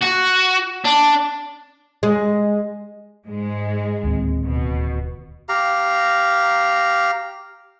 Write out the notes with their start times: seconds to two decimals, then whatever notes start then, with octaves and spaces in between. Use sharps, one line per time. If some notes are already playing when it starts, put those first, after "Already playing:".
0.01 F#4
0.84 D4
2.03 G#3
3.27 G#2 G#3
4.04 D1 D#2 C4
4.44 B2
5.49 G4 F5 A#5